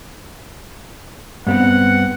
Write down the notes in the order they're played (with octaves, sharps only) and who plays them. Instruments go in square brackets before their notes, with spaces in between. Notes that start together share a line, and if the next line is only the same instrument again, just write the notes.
[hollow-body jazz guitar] G2 B3 C4 [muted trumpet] F#5